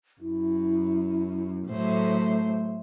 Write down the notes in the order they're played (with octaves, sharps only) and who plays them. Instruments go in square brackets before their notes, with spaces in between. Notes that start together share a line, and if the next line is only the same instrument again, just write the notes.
[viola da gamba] F#2 [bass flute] E4
[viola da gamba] A2 F#3 C5 [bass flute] A3